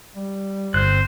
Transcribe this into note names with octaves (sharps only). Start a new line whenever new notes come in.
G3
G1 C4 C5 F#6